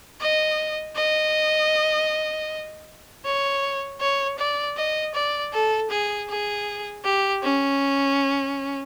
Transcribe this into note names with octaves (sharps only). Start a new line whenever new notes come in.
D#5
D#5
C#5
C#5
D5
D#5
D5
A4
G#4
G#4
G4
C#4